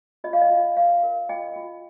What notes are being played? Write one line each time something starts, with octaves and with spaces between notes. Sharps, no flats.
F4 D#5
F5
D#5
F4
A#4 F5
A#4
F4 D#5 G5
F4